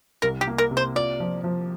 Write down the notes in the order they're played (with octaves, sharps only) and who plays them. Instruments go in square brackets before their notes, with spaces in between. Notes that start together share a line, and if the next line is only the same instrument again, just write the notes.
[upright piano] C2 [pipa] A#4
[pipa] G4
[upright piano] A#3
[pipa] A#4
[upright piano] C3
[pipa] C5
[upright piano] F4 [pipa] D5
[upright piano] F3
F3